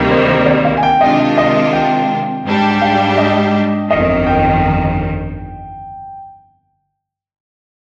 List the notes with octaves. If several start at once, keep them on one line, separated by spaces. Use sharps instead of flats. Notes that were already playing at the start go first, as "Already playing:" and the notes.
Already playing: D2 C3 D#3 G3 A#3
C5
C5
D5
F5
G#5
G5
C3 D#3 G#3 D4 F4 D#5
D#5
G5
G#2 G3 D4 G4
G5
F5
D#5
G1 F2 D#3 D#5
G5